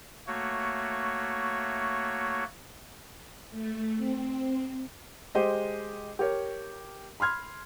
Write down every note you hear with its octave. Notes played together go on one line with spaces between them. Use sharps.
A3 A#3 F#4 C#5
A3
C4
G#3 G4 C5 D#5
G4 A#4 C#5
B5 C6 F6 G#6